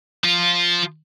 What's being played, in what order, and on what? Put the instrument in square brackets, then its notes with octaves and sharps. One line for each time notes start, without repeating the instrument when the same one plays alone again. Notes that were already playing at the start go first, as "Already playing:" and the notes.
[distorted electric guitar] F3 F4